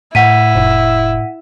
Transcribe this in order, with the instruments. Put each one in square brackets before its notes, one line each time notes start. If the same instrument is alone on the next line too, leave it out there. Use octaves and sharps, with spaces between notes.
[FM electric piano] A2 [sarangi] E4 [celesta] F#5 B6 D#7
[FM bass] F1